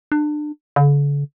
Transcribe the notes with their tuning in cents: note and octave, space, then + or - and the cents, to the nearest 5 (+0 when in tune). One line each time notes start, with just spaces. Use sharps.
D4 +30
D3 -45